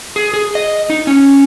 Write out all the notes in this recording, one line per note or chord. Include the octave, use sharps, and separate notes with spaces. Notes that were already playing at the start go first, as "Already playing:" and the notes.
G#4
G#4
D#5
D#4
C#4